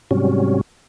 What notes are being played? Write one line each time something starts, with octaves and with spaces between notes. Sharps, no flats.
G#2 C3 F#3 G3 C#4